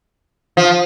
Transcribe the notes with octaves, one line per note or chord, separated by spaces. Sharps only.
F3